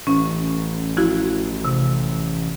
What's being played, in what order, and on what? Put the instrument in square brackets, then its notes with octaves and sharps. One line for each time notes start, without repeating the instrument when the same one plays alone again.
[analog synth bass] A1 [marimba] C#4
[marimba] F3 E4 F#4
C3